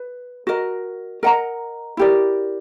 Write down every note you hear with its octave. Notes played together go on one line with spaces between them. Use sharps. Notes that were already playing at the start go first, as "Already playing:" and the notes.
Already playing: B4
F#4 A#4 D#5
A#4 D#5 F#5 A#5
E4 G4 A#4 D5